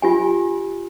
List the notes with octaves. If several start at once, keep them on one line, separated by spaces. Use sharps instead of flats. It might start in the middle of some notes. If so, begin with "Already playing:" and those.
F4 G4 G#5